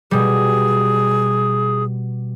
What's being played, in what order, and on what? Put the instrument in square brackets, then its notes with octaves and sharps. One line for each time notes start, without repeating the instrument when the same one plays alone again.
[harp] B2 G3 [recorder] G#4